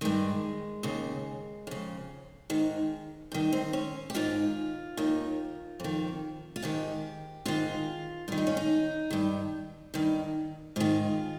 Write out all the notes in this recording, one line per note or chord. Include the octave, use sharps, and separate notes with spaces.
G2 D#3 G#3
D#2 C#3
F2 C#3
G#2 D#3
G2 D#3
C4
C#4
G4
G#2 D#3 F4
D#2 D#3
F2 D#3
F4
G#2 D#3 G4
G#2 D#3 F4
G2 D#3 F4
D#4
C#4
D#4
G2 D#3
G2 D#3
G#2 D#3 F4